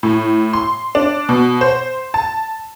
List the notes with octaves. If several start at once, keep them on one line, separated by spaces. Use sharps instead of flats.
A2
C6
D4
B2
C5
A5